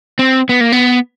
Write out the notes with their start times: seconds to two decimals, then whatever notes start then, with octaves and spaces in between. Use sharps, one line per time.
0.19 C4
0.49 B3
0.61 A#3
0.72 B3